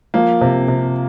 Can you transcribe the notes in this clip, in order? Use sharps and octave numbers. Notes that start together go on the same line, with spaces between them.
F3 A#3
C3
C3